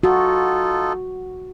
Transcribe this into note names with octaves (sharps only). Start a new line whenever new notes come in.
D#4 F4 F#4 A4